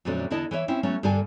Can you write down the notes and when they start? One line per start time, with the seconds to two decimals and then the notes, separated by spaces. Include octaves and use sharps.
0.05 F2 A#2 D3 F#3 A3 C#4
0.30 E2 D3 E4 D#5 A5
0.51 E3 B4 C#5 E5
0.68 C4 C#4 E4
0.83 F#3 A3 B3 C#4
1.03 G2 D3 A#3 A4 G#5